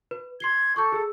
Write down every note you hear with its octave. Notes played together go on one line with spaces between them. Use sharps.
B4
C6 G#6 C7 G7
A4 C#6 D6 G6
G#4 E6